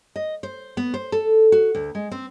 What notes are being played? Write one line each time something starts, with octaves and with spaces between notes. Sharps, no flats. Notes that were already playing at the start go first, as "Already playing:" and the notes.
D#5
C5
B3
C5
A4
F#4
D2
G#3
C4